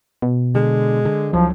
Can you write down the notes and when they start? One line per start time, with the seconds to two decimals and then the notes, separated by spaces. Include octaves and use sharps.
0.22 B2
0.55 D3 G#3
1.05 D3
1.33 C#2 F3 F#3